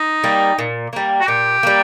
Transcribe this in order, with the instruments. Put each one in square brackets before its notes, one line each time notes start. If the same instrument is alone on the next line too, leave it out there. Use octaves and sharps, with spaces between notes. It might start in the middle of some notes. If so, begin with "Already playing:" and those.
Already playing: [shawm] D#4
[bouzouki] G3 A#3
A#2
G3 A#3
[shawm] F#4
[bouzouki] A#2 [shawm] G4
[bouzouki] G3 A#3